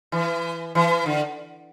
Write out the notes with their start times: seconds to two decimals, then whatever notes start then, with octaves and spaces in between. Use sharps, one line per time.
0.12 E3
0.75 E3
1.06 D3